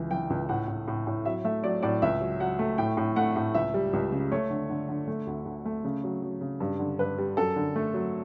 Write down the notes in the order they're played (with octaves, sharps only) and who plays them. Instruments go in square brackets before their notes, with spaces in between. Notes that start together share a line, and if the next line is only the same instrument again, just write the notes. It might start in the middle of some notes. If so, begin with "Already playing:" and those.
Already playing: [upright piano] C#2 E3
E3 G5
C#2
A2 F#5
A2
A2
A2
F#3 E5
A3 E5
F#3 D5
A2 D5
C#2 E5
F#3
F#3 F#5
A3
A2 G5
A2
A3 F#5
A2
C#2 E5
G3
C#2
C#3
A3 C#5
D3
D3
D3
A3
D2
D2
A3
C#3
F#3
F#3
C#3
G2
D3
G2 B4
G3
F#2 A4
D3
A3
F#3